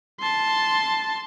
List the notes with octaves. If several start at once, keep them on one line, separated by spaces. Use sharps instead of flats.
A5 C6